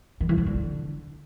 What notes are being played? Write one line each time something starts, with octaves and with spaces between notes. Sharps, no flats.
D#3
E3
F3
D3